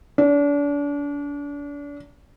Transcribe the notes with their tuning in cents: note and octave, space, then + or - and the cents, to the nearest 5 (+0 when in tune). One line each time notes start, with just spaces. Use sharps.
D4 -35